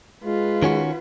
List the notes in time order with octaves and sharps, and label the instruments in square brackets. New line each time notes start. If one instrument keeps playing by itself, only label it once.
[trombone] G#3 [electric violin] F4 B4
[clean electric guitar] D#3 C#4 F#4